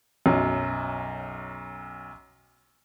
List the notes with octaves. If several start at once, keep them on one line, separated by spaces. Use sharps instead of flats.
B1 F#2